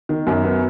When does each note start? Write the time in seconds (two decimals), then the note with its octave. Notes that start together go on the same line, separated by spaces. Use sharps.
0.09 D#3
0.27 F#2
0.44 B3